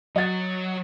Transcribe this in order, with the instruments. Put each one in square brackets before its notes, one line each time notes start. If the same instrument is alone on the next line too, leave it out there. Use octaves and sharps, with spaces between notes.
[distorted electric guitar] F#3 [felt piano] D#5 F#5 A6